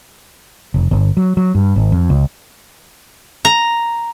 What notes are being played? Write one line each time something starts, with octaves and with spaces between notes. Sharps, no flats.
F1
G1
F#3
F#3
G2
G#1
F2
C#2
A#5